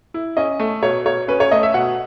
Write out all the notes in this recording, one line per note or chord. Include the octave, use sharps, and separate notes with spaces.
E4
C#4 D#5
A3
B2 C#5
B2 C#5
C#4 B4
C#5
A3 D#5
E5
B2 F#5